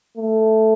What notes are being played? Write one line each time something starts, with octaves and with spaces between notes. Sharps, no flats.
A3